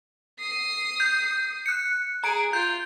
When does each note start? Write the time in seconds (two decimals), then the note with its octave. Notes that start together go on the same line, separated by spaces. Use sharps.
0.39 D#6 C7
1.00 G6
1.66 F#6 C#7
2.24 G#4 A#5 D7
2.53 F4 G6